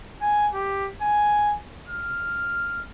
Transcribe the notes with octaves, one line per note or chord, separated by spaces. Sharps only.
G#5
G4
G#5
F6